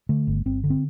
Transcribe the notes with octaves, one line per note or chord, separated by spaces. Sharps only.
D3 A3
G1
G1 C4
D3
C4